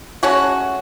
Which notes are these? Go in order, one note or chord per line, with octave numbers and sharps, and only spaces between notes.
G#3 A3 C#4 F#4